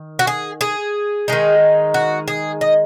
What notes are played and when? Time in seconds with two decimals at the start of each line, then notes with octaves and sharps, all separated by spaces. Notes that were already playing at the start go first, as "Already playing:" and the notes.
Already playing: D#3
0.19 F#4
0.27 G#4
0.61 G#4
1.28 D#3 G#3 D#4
1.94 F#4
2.28 G#4
2.61 D#5